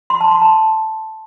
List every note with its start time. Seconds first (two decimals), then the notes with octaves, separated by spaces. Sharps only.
0.10 C6
0.21 A5
0.31 C6
0.42 A5